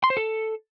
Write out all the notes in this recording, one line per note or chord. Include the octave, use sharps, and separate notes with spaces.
C6
C5
A4